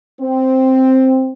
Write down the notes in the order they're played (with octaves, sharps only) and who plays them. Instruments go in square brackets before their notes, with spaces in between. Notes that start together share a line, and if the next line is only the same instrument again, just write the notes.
[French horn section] C4